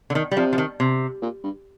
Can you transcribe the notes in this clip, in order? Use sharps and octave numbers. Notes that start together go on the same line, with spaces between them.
D3
D#3
G3
C3 F3
F3
D#3
C3
A#2
G2